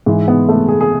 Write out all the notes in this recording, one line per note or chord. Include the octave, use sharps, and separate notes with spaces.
G#2 E3
B3
A3
G#4
G#4